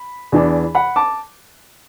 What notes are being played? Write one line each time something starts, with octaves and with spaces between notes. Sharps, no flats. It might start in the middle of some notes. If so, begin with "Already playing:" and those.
Already playing: B5
E2 E3 D4
F#5 B5
A5 D6